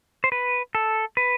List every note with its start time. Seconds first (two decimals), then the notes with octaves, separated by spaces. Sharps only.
0.24 C5
0.32 B4
0.75 A4
1.17 B4